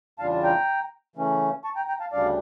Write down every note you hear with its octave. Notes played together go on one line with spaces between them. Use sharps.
E2 C#3 G3 D4 F4 F5 A5
A5
G5 A#5
C#3 E3 A3 C#4
A5 C#6
G5 A#5
G5 A#5
F5 A5
D2 C#3 G3 D4 D5 F5